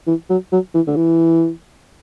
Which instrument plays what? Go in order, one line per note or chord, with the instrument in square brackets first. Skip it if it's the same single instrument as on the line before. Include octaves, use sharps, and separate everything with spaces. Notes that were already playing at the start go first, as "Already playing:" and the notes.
[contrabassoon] E3
F#3
F#3
E3
D3
E3